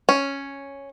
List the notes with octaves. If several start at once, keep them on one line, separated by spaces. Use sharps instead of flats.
C#4